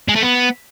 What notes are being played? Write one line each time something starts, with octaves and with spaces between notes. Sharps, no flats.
G#3
A3
B3